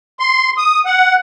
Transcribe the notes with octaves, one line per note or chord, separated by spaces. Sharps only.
C6
D#6
F#5